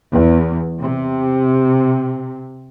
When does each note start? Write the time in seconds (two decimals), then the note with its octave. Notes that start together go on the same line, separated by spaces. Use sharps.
0.12 E2
0.81 C3